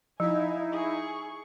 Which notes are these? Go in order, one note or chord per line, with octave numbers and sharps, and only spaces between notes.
F3 D#4 E4 F5 G#5
G#4 C#6